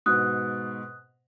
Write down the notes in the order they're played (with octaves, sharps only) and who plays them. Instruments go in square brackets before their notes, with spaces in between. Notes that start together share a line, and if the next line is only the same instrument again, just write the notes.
[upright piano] G#2 B2 [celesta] D#6 F#6